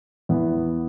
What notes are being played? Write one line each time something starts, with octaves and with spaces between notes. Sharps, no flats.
E2 E3 B3